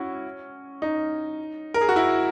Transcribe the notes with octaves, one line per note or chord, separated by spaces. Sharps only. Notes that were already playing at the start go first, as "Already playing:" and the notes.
Already playing: C#4 E4 F#4
D#4
A#4
G#4
F#4
E4